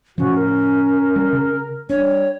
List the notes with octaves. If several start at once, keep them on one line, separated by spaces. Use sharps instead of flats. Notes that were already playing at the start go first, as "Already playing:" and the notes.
A2 C#3 F3 C#4 F#4
A#4
G3
C#3
G3 D4 C#5